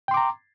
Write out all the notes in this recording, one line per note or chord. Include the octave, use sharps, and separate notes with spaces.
G5 A#5 C6 D6